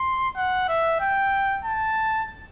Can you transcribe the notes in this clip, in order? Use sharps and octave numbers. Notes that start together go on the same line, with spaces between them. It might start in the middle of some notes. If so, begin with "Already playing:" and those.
Already playing: C6
F#5
E5
G5
A5